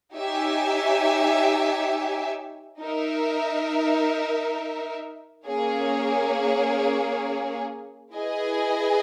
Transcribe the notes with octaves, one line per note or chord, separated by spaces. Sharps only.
D#4 G4 C#5 E5 G#5
D#4 A#4 E5
A#3 C#4 G#4 C#5
E4 G#4 B4 D#5 G#5